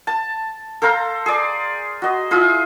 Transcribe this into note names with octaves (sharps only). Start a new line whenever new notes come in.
A5
A4 C5 F5 A#5
G#4 D5
F#4 D#5
E4 F4 G#4